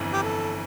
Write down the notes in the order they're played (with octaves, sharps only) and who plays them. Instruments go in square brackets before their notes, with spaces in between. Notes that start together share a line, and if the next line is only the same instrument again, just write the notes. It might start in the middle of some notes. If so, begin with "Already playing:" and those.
Already playing: [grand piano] G1 F2 E3
[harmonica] G4
A4